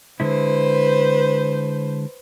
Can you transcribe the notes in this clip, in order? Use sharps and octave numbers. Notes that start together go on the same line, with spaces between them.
D3 G#3 E4 B4 C5